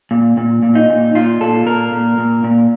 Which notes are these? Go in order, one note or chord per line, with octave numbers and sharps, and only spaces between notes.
A#2
A#2
A#2
D#4
A#2
A#2 F4
A#2 A4
A#2 A#4
A#2
A#2
A#2